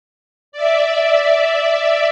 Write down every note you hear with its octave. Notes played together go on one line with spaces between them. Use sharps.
D5 E5